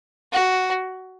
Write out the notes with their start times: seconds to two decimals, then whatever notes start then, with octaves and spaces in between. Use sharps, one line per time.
0.32 F#4